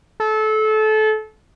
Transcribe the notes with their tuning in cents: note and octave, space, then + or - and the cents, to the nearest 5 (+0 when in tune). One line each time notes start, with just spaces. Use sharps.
A4 -25